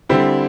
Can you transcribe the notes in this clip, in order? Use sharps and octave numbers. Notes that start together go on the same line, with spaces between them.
D3 G3 C4 E4